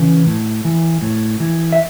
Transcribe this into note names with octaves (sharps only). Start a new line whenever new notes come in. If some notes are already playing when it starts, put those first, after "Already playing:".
Already playing: C#3 E3
A2
E3
A2
E3
E5